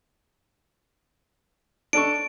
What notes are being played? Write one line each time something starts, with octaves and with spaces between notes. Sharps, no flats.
D4 A4 C#6 D7